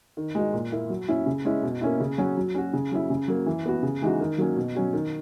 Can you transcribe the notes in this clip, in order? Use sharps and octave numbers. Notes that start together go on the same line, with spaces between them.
D#3
G#3 D#4 F#4
A#2
A#3 E4
F#3
C#4 E4
C#3
G#3 C#4 E4
B2
A#3 C#4 E4
C#3
F#3 C#4 F#4
F#3
C#4 F#4
C#3
F#3 C#4 E4
C#3
F#3 A#3
E3
B3 F#4
C#3
E3 G#3 D#4 F#4
D#3
F#3 A#3 C#4
B2
F#3 C#4 F#4
D#3